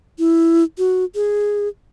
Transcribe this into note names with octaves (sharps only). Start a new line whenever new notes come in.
E4
F#4
G#4